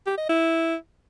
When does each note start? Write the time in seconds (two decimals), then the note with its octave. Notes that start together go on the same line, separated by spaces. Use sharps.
0.06 G4
0.18 D#5
0.29 E4